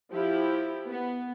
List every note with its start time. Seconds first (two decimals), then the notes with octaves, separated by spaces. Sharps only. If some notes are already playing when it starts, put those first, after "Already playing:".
0.10 F3 E4 G4
0.89 B3